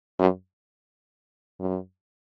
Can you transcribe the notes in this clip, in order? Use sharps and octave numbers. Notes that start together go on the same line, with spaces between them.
F#2
F#2